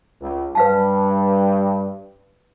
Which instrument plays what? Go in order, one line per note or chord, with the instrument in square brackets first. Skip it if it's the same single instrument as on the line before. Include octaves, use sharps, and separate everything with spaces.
[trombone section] C#2
[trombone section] G2 [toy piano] B4 F5 A5